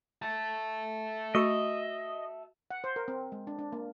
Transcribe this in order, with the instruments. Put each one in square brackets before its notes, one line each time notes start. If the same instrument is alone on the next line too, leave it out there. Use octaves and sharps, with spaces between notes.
[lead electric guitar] E5 A5
[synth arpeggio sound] A3 C#6 E6 [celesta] F#4 [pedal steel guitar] D#5
[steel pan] F#5
C5
A#4
C4
G#3
D4
D4
A#3